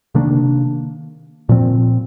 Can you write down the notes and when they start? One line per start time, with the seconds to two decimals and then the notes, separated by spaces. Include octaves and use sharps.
0.15 C3 D#3 A#3 D4
1.49 A#2 F3 C4